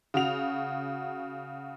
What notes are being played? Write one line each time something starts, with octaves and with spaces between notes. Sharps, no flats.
C#3 F#4 F7